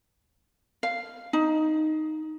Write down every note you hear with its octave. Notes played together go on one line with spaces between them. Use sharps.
F5
D#4